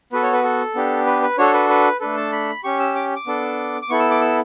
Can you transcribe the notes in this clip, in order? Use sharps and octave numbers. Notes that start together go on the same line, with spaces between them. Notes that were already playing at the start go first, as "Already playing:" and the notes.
B3 F#4 A4 B4
C#5
B4
A4
B3 D4 G4
B4
B4
D4 F#4 A4 C#5
B4
B4
A3 D4 A4 B4
A5
B5
C#4 G4 C#6
E6
D6
D6
B3 D4 A4
D6
B3 E4 A4 C#6
E6
D6
E6